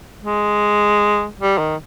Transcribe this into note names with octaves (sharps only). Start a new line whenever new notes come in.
G#3
G3
D#3